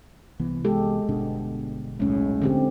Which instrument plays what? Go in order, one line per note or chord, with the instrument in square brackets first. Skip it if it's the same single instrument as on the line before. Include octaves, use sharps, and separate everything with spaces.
[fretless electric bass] C2 E3 B3
[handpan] G#3 G4 A4
[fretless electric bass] G1 B2 D4
[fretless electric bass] D#1 B1 A2 [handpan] G#3 C#4
[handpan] D3 C4 G4